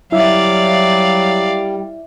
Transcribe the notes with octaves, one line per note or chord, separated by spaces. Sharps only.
F#3 G3 E4 D5 E5 F5